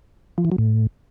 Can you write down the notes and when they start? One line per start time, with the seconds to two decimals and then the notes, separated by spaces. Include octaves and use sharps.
0.38 F3
0.45 E3
0.52 F#3
0.58 A2